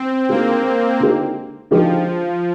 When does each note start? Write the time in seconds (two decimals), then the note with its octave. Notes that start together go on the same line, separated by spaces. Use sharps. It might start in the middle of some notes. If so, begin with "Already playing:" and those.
Already playing: C4
0.29 D3 G#3 A#3 D#4 G4
1.00 D3 G#3 D#4 G4
1.71 D3 F3 G#3 D#4 G4